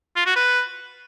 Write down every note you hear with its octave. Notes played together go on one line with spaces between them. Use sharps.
F4
F#4
B4